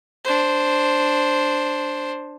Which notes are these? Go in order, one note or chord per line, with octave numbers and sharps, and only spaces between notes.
D4 C5